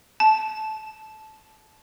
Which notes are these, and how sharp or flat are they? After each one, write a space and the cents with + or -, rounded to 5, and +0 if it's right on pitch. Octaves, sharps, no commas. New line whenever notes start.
A5 -20